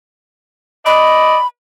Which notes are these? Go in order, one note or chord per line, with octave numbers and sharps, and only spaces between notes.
D5 D#5 B5